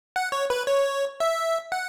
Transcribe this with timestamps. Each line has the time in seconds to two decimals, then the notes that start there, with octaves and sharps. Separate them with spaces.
0.16 F#5
0.32 C#5
0.50 B4
0.67 C#5
1.20 E5
1.72 F#5